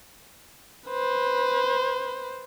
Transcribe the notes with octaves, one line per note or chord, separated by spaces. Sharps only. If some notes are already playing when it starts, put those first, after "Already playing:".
B4 C5